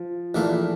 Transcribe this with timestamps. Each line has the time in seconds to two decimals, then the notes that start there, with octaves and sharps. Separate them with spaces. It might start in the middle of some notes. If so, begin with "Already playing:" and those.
Already playing: F3
0.35 A#1 A#2 E3 A3 D4 F4